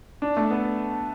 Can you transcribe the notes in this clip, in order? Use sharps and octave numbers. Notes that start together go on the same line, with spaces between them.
D4
A3
B3